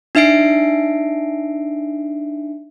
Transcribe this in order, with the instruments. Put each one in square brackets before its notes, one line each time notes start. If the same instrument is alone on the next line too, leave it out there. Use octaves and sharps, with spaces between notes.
[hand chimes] D4 D#4 E5 C7 D7